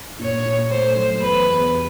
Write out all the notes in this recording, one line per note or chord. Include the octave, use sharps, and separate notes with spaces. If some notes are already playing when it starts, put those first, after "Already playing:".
A#2 C#5
A#2
A3 C5
F#3
E2 B4
E2
G3